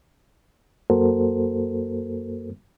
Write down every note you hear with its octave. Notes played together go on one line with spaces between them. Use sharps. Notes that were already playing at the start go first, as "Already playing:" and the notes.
F#2 A#3 F#4 A4 A#4 C5